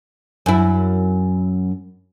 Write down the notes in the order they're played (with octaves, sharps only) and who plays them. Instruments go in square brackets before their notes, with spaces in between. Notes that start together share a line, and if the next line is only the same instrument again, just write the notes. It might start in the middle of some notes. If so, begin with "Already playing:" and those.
[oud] F#2 E4